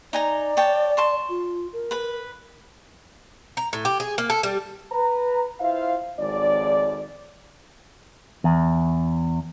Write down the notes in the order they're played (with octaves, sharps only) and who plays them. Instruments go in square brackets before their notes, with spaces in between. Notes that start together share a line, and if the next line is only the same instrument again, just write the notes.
[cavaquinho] D#4 G#5 A#5 [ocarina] D5
[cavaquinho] C#5 G5 A5
A5 C6 C#6
[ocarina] F4
A#4
[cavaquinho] B4 B5
[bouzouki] A#5
A2
G4
G#4
A#3
A4
G3
[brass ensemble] B4 A#5
E4 F4 C5 E5 F5
G#1 F2 G#2 C#5 D5
[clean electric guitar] E2